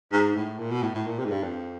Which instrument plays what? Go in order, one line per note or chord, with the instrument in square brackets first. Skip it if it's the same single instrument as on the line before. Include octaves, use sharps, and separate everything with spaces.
[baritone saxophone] G#2
A2
A#2
B2
A2
A2
A#2
C3
G#2
G2
F2